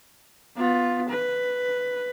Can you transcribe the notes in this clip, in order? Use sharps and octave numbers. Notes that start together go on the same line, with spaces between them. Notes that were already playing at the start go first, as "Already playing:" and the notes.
B3 F4
B4